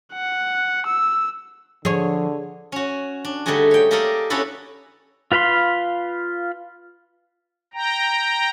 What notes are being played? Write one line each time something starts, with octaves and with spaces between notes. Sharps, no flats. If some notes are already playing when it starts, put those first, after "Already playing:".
F#5
E6
D3 F3 G#4 C#5
C#4 F#4
D4
D3 G3 A3 D#4 F#4 G#4
C#5 G5
A#3 G4 A4 A#4 D5 D#5
C#4 D4 E4 F#4 A4 B4
F4 B4 F5 B5 C6
G5 A#5